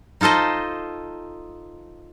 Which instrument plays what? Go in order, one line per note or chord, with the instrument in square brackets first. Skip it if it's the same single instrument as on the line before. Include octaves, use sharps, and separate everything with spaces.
[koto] D#4 F4 A4 C5 D#5